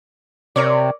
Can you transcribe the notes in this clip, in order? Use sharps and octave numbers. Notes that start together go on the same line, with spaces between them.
C3 A#4 C#5 D5